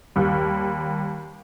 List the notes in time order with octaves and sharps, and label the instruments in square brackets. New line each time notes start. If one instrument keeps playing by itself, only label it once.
[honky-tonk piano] D#2 G3